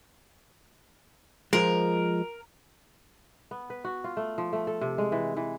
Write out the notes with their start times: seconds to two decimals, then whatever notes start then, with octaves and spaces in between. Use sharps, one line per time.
1.53 F3 G#3 A#4
3.51 B3
3.70 B4
3.84 F#4
4.04 F4
4.17 A3
4.38 F3
4.53 A3
4.67 A4
4.81 C3
4.98 G#3
5.12 E3
5.37 E3